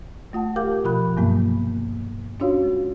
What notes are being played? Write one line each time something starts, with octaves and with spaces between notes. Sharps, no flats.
A3 F4 F#5 A5
G4 A#4 F5 G5 D6 G6
B2 F3 F4 A#4 B5 F#6
G2 C3 F#3 A#3 B3
C#4 D4 F4 F#4 C#5 F5
G#3